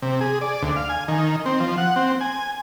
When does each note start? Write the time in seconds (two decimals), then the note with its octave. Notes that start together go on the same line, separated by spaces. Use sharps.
0.02 C3
0.21 G#4
0.41 D5
0.62 D2
0.76 F5
0.89 G#5
1.08 D#3
1.46 C4
1.60 F3
1.78 F#5
1.96 C4
2.21 G#5